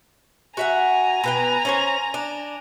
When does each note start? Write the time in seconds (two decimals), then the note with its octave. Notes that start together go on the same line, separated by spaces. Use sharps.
0.57 F#4 E5 F#5 G#5 A#5
1.24 B2 B4 G5
1.65 C#4 C5 C#5
2.14 D4